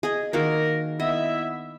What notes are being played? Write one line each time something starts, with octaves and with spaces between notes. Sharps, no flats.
G#4 D#5
D#3 A#3 F#4 A#4
B3 E4 D#5 E5